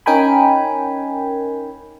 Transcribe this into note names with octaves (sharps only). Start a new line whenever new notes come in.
C#4 D#4 A#4 G5 G#5 B5